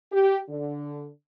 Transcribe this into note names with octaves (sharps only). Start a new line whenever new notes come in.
G4
D3